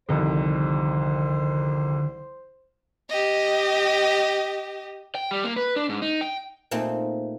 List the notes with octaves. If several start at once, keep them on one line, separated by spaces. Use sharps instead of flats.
C2 F2 D3 D#3 G3 A#4 C5
G4 D#5
G5
G3
A#3
B4
D4
G#2
D#4
G5
A#2 A3 A#3 C4 D#4